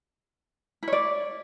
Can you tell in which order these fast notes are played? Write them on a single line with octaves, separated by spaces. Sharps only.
E4 C#5 D5